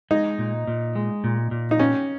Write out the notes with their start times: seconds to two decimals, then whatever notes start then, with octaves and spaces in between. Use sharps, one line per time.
0.11 G#3 D#4
0.38 A#2
0.67 A#2
0.96 G#3
1.24 A#2
1.51 A#2
1.71 D#4
1.79 C#4 G4